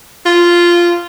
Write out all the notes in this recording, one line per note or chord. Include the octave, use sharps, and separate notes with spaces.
F4